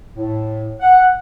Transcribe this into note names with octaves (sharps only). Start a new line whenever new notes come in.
A2
F#5